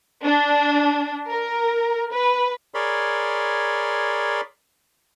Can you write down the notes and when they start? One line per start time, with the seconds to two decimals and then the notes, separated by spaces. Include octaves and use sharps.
0.23 D4
1.27 A#4
2.11 B4
2.74 G#4 A#4 C#5 D5 B5 C6